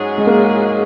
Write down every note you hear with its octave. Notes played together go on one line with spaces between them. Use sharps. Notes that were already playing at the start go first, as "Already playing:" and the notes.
Already playing: G#2 F#3 C#4 G#4
G#3
A#3